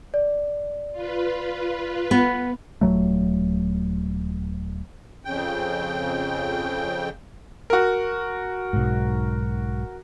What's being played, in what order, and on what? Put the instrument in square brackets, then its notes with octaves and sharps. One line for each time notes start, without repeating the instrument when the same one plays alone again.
[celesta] D5
[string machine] F4 B4
[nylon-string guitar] B3
[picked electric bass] D#1 F2 F#3 A3
[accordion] F2 C#3 G5
[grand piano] F#4 A#4
[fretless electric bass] B1 G#2